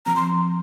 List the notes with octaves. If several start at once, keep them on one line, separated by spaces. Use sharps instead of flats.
F3 C4 A#5
C6